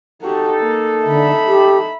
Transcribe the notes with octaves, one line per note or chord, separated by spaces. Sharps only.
D#4 F#4 G4 A4
A#3
D3 E5 B5
G4